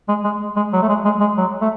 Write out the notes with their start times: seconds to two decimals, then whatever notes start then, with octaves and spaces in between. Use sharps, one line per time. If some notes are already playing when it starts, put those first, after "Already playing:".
0.08 G#3
0.24 G#3
0.56 G#3
0.73 F#3
0.82 A3
0.89 G#3
1.05 G#3
1.20 G#3
1.38 F#3
1.61 A3